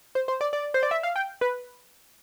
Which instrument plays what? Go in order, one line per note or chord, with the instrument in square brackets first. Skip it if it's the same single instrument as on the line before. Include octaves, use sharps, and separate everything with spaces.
[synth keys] C5
C5
D5
D5
C5
D5
E5
F5
G5
B4